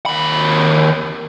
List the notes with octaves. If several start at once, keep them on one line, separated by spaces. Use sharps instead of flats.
D#2 B5